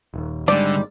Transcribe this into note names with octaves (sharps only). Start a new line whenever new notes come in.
D#1 D#2
G#1 D3 G3 G#3 D5